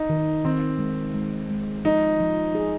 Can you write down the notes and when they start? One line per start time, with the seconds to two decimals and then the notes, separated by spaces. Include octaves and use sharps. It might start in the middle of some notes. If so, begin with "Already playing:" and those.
Already playing: D#4
0.10 D#3
0.45 D#3 C4
0.79 G#3
1.15 G#3
1.50 G#3
1.85 F3 D#4
2.20 F3
2.55 G#4